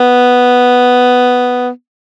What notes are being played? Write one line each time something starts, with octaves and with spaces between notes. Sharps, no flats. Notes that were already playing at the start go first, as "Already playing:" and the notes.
Already playing: B3